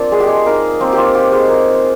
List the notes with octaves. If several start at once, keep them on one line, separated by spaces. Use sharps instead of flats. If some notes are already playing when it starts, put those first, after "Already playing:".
Already playing: A#3 C4 D4 F4 A#4
G#3 G#4
G4
G#3 G#4
A#3 D#4 A#4
A#3 C4 C5
F4 G4
F4 G4
G#3 G#4
A#3